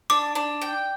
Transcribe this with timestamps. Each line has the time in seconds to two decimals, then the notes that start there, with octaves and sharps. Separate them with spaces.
0.10 D4 D6
0.35 D4
0.62 G5